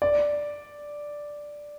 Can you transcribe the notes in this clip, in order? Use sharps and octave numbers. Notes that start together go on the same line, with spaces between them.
D5